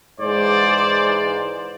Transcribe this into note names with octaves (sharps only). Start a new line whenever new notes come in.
G#2 E3 G#3 C5 D5